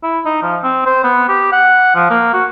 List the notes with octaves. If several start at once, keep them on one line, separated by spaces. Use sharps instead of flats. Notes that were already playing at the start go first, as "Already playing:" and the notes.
E4
D#4
F3
C4
C5
B3
G4
F#5
F3
A#3
F#4